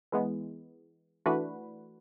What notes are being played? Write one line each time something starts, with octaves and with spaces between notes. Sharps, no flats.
E3 G#3 B3
E3 A3 D4 F#4 B4